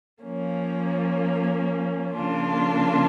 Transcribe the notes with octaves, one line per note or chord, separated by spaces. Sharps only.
F3 A#3 C#4
C#3 F3 A#3 D4 F4